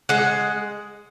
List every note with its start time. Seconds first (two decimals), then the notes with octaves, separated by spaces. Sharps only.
0.09 G#3 F#5